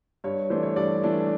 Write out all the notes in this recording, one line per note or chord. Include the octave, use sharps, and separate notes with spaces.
G2 C#5
E3 A3 D4 C5
C#5
G2 D5
E3 A3 D4